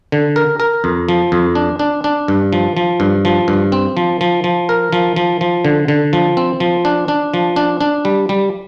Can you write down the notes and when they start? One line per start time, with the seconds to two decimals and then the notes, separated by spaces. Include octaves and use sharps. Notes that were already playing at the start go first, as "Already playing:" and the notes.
0.12 D3
0.36 A#4
0.60 A#4
0.84 F2
1.09 F3
1.32 F2
1.55 D4
1.79 D4
2.04 D4
2.28 G2
2.53 F3
2.77 F3
3.00 G2
3.25 F3
3.48 G2
3.72 C4
3.97 F3
4.21 F3
4.44 F3
4.69 A#4
4.93 F3
5.16 F3
5.41 F3
5.65 D3
5.88 D3
6.13 F3
6.37 C4
6.60 F3
6.85 D4
7.08 D4
7.34 F3
7.56 D4
7.81 D4
8.05 G3
8.29 G3